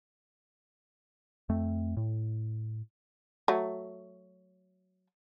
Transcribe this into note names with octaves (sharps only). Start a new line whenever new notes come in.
F2 A3 C4
A2
F#3 A3